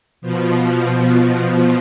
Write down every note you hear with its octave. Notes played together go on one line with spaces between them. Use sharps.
B2 F3